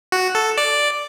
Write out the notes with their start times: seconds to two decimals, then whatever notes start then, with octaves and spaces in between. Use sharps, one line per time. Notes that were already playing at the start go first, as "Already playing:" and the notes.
0.12 F#4
0.35 A4
0.57 D5